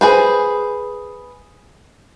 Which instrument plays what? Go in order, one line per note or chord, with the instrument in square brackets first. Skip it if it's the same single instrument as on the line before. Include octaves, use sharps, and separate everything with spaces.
[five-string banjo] G#4 B4 C5